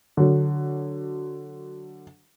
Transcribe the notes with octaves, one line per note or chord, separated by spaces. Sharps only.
D3 F#3